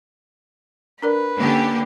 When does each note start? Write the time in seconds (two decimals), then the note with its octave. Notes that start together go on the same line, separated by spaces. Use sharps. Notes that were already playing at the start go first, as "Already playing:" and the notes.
1.02 D4 A#4 B4 D5
1.37 D3 A#3 C#4 G4